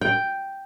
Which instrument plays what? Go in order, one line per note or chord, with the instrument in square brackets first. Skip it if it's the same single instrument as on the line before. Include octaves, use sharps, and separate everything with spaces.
[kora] G5